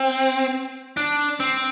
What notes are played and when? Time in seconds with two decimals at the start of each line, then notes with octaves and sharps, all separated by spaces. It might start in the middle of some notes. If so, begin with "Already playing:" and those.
Already playing: C4
0.97 D4
1.40 C4